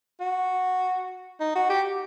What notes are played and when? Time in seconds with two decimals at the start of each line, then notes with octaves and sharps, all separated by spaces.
0.20 F#4
1.40 D#4
1.55 F#4
1.70 G4